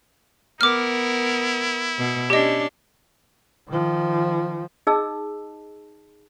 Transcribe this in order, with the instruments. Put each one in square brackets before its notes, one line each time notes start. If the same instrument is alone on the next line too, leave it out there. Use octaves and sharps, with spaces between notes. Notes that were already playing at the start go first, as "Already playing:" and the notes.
[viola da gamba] B3 A#4 [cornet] E4 [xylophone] D6 F6
[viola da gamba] B2
[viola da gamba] C#4 D4 [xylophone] G4 D#5
[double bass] D#3 F3
[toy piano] D#4 G#4 D#5 A5 E6